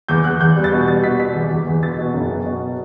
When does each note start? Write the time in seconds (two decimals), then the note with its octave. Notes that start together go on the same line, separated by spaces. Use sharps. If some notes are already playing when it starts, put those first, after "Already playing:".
0.08 E2 G6
0.24 E2 F#6
0.40 E2 G6
0.56 G3
0.64 A6
0.72 B2
0.88 G3 A6
1.04 B2 B6
1.20 B2 B6
1.35 E2
1.51 E2
1.67 E2
1.83 B2 A6
1.98 B2
2.14 F#1
2.31 B2
2.46 B2